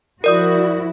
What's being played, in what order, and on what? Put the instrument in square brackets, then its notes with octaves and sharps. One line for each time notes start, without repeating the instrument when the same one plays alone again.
[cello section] F3 E4 F#4 [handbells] A#4 D5 D#6